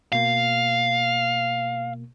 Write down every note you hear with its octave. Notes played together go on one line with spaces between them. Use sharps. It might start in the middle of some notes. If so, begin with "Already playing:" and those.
B2 A#3 F5